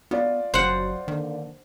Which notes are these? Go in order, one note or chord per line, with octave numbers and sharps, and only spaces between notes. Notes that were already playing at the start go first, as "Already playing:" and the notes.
B3 F4 D5
F#1 F#2 F#3 C5 F#5
D3 D#3 A#3 D4